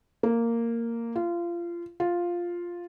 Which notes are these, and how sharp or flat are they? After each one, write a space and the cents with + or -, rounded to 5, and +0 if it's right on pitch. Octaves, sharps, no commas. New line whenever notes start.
A#3 -10
F4 -25
F4 +0